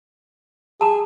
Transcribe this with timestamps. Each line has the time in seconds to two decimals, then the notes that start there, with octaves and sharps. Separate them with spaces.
0.81 G#4 A5 A#5